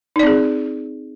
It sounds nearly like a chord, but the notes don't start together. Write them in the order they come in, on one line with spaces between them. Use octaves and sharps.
D#4 D5 C4 G#4